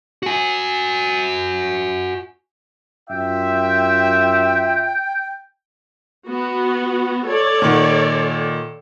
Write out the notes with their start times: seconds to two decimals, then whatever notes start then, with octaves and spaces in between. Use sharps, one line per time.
0.23 F#4 G#5
3.10 F#2 F4 E5 G5
6.29 B3 F#4
7.27 A4 C#5 D5
7.62 A#2 D#3 F#5